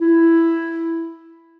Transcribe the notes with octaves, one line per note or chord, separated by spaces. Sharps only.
E4